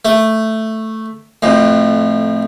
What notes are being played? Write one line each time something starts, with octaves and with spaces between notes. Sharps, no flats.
A3
F2 A2